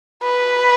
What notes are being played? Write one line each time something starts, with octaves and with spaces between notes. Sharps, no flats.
B4